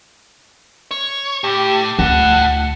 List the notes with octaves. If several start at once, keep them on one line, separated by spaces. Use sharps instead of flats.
C#5
A2 G4
D2 A2 F#5